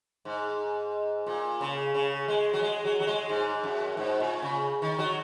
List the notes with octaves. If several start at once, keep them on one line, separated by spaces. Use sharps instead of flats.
G#2
A#2
C#3
C#3
G#3
F#3
G#3
F#3
F#3
G#3
G#2
F#2
G#2
A#2
C#3
D#3
F#3